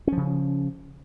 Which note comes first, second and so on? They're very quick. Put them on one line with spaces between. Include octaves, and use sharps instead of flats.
C#4 F3 C#3